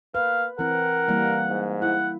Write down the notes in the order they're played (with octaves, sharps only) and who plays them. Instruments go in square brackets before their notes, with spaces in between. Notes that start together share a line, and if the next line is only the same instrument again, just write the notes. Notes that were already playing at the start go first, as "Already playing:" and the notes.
[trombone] A#3 [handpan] B4 [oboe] F5
[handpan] E3 C4 [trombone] A#4 [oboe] F#5
[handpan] E3 G3 A#3
[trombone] G#2
[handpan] E4 [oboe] F#5